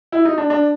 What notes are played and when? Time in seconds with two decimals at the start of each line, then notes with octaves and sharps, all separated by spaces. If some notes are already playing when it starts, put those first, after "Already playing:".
0.12 E4
0.25 D#4
0.38 D4
0.50 D4